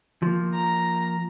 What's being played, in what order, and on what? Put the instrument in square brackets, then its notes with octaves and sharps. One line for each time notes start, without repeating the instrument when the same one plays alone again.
[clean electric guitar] F3 A#3
[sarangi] A#5